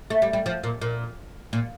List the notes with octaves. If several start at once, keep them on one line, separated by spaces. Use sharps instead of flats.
A3
G3
G3
F3
A#2
A#2
A#2